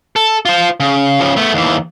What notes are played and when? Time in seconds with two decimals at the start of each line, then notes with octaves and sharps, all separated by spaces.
0.16 A4
0.45 F4 C5
0.80 C#3
1.20 C#3 F3
1.36 A3 B3
1.54 D#2 E3